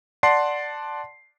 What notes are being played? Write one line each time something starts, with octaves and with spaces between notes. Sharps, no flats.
D5 F#5 A5 C6 C7